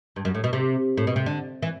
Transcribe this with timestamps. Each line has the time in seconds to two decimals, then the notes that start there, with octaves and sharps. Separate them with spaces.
0.16 G2
0.25 F#2
0.35 A2
0.44 B2
0.53 C3
0.97 A2
1.07 B2
1.16 C3
1.26 D3
1.62 E3